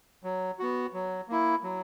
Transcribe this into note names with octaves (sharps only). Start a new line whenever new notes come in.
F#3
B3 F#4
F#3
A#3 E4
F#3